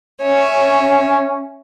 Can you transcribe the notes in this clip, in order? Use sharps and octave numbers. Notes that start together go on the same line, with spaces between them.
C#4 C#5 E5 G#5